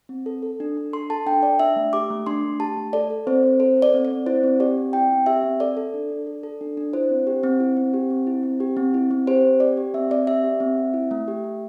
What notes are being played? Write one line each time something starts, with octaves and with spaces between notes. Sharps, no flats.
C4
A4
A4
D4
D4
A4 C6
A4 A5
D4 G5
D4 D5
D4 E5
A3
G4 D6
A3
D4 C6
A3
G4 A5
A3
A4 D5
A4
C4 C5
C4
A4 C5
A4
D5
C4
D5
C4
E4 C5
C4
G4 D5
C4
E4 G5
C4
G4 E5
C4
A4 D5
A4
D4
D4
A4
A4
D4
D4
E4 C5
C4
G4
C4
E4
C4
G4
C4
E4
C4
G4
C4
E4
C4
G4 C5
C4
G4 D5
G4
C4 E5
C4 D5
G4 E5
G4
C4
C4
E4
A3
G4
A3